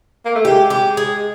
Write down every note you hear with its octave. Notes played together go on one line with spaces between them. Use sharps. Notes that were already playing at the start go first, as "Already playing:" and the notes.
A#3
A3
G#3 G4
G4
G#4